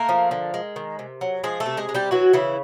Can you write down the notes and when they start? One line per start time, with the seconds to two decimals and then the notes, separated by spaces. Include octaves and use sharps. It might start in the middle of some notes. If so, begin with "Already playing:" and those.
Already playing: A3 A#3 A#4
0.09 F3
0.31 D3
0.54 G#3
0.76 D#3
0.99 C3
1.21 F#3
1.44 F3 G#3 G#4
1.60 A3 A4
1.66 C3
1.77 G#3 G#4
1.89 G#3
1.95 G3 G4
2.11 E3 F#3 F#4
2.33 C#3 E3 E4